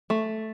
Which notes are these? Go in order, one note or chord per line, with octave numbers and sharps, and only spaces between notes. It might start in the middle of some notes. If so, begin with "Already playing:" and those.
A3